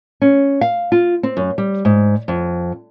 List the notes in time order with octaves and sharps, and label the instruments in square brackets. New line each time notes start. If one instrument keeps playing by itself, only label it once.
[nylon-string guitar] C#4
F5
F4
C4
F#2
G3
G#2
F2